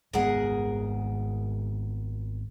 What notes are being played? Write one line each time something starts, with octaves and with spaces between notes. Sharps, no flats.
G#1 G#3 B3 G#4 A#4 F#5